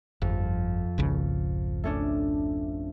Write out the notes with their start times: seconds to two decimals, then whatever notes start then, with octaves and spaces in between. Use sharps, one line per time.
0.22 G1 F2
0.98 G#1 C#2 C#3
1.84 A3 C#4 D4